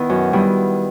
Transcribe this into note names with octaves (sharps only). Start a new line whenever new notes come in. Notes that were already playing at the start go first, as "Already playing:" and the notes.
Already playing: D#3 B3 E4
F#2
D#3 G3 B3 E4